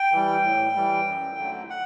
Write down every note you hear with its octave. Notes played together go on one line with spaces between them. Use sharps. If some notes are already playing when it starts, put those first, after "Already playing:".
Already playing: G5
E3 G3
A2
E3 G3
F#2
D3 F#3 A3
F#5